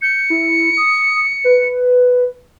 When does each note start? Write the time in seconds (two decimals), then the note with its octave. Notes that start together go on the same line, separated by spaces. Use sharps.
0.02 G6 C#7
0.30 E4
0.77 D#6
1.44 B4